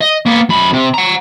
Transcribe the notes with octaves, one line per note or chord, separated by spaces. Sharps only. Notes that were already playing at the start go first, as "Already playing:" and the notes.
D#5
A#3 B3
F#2 B5
C3
F#5 A#5